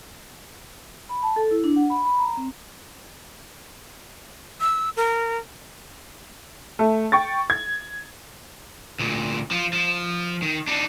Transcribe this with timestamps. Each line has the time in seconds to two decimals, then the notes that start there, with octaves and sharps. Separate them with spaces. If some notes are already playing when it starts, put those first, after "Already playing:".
1.09 B5
1.23 A5
1.36 A4
1.51 E4
1.64 D4
1.76 F#5
1.90 B5
2.05 B5
2.19 A#5
2.37 C4
4.61 E6
4.97 A#4
6.79 A3
7.12 G5 C#6 A6
7.50 G#6
9.00 D2 A#2
9.51 F3 F4
9.73 F3
10.42 D#3
10.67 D4 D#4